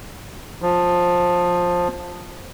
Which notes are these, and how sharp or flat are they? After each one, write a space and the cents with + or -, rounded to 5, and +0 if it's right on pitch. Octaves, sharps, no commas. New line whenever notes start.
F3 +15